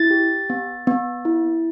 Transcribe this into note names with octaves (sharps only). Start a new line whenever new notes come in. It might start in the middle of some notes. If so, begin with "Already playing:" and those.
Already playing: E4 A6
G4
B3
B3
E4